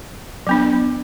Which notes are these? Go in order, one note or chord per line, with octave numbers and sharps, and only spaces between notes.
F#3 B3 D4